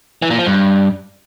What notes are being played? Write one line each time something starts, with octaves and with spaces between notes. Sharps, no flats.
E3
A#2
F3
G2